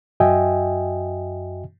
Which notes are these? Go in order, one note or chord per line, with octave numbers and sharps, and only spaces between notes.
F#2 F#4 D#5 E5 G5 G#5